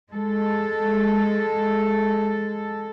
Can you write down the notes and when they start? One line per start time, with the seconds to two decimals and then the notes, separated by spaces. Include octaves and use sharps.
0.11 G#3 A4